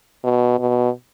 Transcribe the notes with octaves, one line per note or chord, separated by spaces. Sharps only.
B2
B2